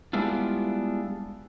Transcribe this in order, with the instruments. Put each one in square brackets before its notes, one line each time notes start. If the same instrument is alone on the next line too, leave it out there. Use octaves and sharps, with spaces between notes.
[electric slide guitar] G3 G#3 B3 D4 E4 F4